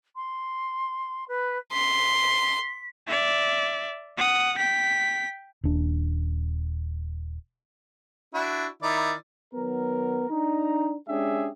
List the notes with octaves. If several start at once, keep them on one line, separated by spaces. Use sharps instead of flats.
C6
B4
C6 B6
D5 E5
F#5 D#6
G5 B6
D#1 D4
D4 E4 F#4
D#3 E4 D5
D#3 F#3 B3 A#4
D4 D#4 A#5
G#3 C#4 D4 G4 G#4 E5